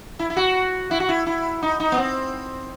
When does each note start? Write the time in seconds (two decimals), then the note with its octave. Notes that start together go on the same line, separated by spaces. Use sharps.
0.19 E4
0.30 E4
0.37 F#4
0.91 E4
1.00 F#4
1.09 E4
1.26 E4
1.62 D#4
1.80 D#4
1.92 B3
1.98 C4